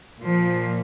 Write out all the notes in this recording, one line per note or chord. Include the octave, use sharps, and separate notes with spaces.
A#2 F3